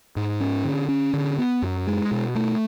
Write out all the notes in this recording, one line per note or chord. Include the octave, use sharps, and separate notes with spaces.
G#2
C#4
D3
C#4
D3
B3
F#2
G#3
B2
A3